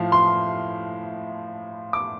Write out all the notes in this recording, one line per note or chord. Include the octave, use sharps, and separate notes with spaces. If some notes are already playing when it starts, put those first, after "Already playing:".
Already playing: A2 F3 F5
C6
D6